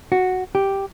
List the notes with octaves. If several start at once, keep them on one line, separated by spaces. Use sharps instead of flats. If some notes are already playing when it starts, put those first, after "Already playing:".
F#4
G4